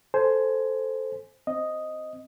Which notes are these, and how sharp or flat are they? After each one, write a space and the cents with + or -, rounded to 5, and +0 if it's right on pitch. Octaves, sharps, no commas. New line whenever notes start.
A4 +0 C5 +0 G#5 +15
C4 +0 D#5 +0